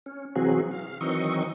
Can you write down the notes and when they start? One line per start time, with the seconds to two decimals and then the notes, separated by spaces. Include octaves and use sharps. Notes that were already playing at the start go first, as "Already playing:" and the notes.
0.06 C#4
0.36 C3 E3 F#3 C4 F#4 G#4
0.71 F5
1.01 D#3 E3 F#3 C4 D#5 C#6